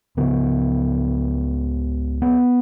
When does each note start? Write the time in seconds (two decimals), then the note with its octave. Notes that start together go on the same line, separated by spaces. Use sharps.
0.17 C#2 C#3 B3
2.22 B3